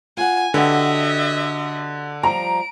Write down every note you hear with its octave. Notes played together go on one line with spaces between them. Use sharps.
F4 F#5 G#5
D3 F#4 G4 B4 D#5 E5
F3 G3 A#5 D7